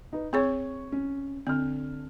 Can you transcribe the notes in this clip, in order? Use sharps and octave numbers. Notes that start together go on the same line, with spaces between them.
D#4 B4
C4 G#4 C#5 C#6 G#6
C#4
D3 C4 F6